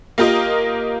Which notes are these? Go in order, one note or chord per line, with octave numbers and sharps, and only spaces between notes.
A#3 F4 G4 A#4 D#5